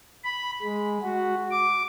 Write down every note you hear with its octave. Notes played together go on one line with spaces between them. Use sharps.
B5
G#3
F#4
D6